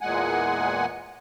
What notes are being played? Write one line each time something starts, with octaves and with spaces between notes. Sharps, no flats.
E2 A#2 G#3 F#5 G#5